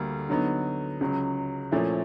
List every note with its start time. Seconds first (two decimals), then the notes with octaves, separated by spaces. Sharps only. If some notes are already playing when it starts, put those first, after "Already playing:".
Already playing: D2 D3 G3 A#3
0.29 D3 F#3 B3 D#4
1.01 C#2 C#3 F#3
1.71 A#2 F3 A3 C#4 E4